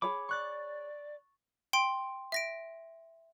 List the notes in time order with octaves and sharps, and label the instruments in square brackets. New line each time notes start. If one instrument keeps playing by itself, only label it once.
[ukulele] G#4 C#5 B5 [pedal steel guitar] D6
[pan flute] D5 [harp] C#6 F#6 A6
[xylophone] G5 C6 D7
E5 A#6 D7